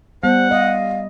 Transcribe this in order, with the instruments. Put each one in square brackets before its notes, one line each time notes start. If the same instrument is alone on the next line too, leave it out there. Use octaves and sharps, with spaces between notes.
[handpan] G3 [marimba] B3 [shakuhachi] C5 [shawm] F#5
[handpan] D#5 [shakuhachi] F5